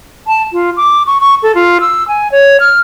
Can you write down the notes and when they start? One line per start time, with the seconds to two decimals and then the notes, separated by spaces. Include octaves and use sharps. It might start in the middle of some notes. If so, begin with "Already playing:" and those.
0.27 A5
0.53 F4
0.77 D6
1.07 C#6
1.20 C#6
1.43 A4
1.55 F4
1.81 E6
2.08 G#5
2.32 C#5
2.60 F6